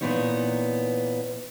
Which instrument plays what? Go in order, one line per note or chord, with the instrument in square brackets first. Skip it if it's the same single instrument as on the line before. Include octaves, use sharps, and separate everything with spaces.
[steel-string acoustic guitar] A#2 D#3 E3 B3 D#4 C#5